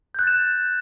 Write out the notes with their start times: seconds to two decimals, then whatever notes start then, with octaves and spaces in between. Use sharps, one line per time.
0.15 G6
0.19 F#6
0.23 A6
0.27 E7